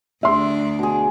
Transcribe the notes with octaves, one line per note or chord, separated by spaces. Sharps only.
D2 D4 E5 C6
B2 G#4